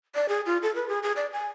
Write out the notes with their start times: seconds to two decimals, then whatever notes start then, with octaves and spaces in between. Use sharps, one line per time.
0.15 D5
0.29 G#4
0.46 F4
0.63 A4
0.75 B4
0.88 G#4
1.03 G#4
1.16 D5
1.33 G#5